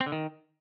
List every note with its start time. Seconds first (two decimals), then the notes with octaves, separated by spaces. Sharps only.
0.01 C4
0.06 D3
0.12 D#3